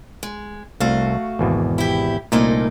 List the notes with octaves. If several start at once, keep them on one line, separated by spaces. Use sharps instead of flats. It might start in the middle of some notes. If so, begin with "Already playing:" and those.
G#3
C2 A3 F#4 F5
G#1 E2 B2
E4 G4
C2 A#2 A3 A#3 D#4